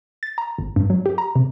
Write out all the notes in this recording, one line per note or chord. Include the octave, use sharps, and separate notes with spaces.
A6
A#5
G1
G2
F#3
G4
A#5
C3